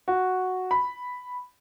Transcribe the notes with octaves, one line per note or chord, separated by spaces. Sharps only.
F#4
B5